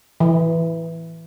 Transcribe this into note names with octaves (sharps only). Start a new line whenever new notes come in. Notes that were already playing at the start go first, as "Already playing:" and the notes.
E3